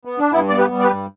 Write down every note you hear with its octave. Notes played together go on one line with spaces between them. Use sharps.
B3
D4
G2 B3 E4
B3 D5
G4 B4
G3
D5
G4 B4
G2